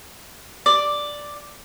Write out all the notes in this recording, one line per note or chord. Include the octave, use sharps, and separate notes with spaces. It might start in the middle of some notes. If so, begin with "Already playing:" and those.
D5